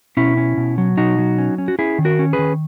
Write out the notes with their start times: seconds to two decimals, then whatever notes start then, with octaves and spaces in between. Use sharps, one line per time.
0.17 B2 C#4 E4
0.37 C#4
0.57 B2
0.78 F#3
0.97 B2 D#4 F#4
1.19 F#3
1.38 C#4
1.58 C#4
1.68 F#4
1.79 C#4 E4 G#4
1.98 D#3
2.05 F#4 A#4
2.19 C#4
2.33 G#4 B4
2.39 D#3